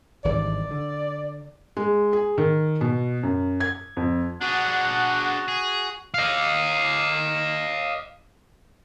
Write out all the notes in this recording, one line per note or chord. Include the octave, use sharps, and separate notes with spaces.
G#1 G2 E3 D5
D3
G#3
G#4
D#3
B2
F#2
G#6
F2
D4 F#4 G#4 F#5
G#4
D#5 F5